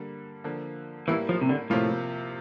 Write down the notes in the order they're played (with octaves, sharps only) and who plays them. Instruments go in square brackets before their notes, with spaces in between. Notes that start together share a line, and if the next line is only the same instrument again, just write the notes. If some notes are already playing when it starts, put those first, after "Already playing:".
Already playing: [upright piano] D3 G3 A#3
D3 F3 A#3
[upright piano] A2 G3 A#3 E4 [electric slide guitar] E3
[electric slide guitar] F3
C3
D3
[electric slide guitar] A2 [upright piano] C3 F3 A#3 F4